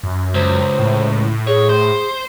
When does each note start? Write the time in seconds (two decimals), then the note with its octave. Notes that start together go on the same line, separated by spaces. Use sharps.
0.04 F#2
0.34 C#2 C5
0.79 A2
1.47 G#4 C#5
1.69 C5